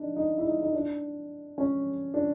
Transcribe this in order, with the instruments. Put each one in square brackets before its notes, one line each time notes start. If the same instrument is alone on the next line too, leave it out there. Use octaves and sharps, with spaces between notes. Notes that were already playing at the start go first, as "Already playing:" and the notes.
Already playing: [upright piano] D4 D#4
D#4
E4
D#4
D#4
D4
C#4
D4